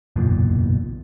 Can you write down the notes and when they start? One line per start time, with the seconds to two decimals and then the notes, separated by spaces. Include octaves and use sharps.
0.16 F#1 B1 E2 A#2